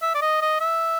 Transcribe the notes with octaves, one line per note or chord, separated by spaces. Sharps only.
E5
D5
D#5
D#5
E5